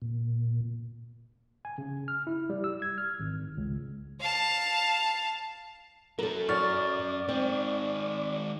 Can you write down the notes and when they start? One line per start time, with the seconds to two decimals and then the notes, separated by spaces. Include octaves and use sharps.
0.02 A#2
1.65 G#5
1.78 C#3
2.08 F6
2.27 E4
2.50 G3
2.64 E6
2.82 G#6
2.98 F6
3.20 G#1
3.57 C#2
4.20 F5 A5
6.19 F#3 C#4 A4 A#4
6.49 F#2 D5 C#6 F6 A6
7.29 D#3 G#3 C4